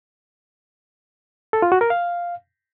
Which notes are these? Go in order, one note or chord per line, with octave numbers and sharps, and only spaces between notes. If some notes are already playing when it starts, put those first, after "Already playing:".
A4
F4
F#4
A#4
F5